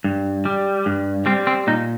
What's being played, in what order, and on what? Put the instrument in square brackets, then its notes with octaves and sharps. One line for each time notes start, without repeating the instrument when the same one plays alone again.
[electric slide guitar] G2
G3
G2
G3 C4
C4
A#2 D#4